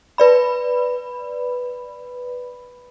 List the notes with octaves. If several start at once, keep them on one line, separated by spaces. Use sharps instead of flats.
B4 D5 B5